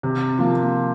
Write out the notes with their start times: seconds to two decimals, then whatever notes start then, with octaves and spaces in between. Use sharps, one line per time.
0.03 C3
0.39 F3 A#3 F4